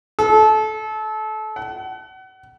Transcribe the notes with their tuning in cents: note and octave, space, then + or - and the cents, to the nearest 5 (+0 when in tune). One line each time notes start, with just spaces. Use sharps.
A4 -25
F#5 +35